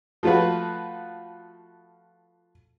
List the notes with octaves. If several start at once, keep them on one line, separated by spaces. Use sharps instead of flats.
F3 A3 F4 F#4 B4